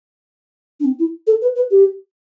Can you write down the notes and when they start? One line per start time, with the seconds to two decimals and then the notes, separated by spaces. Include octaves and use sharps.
0.80 D4
0.85 C4
0.99 E4
1.27 A4
1.42 B4
1.56 B4
1.71 G4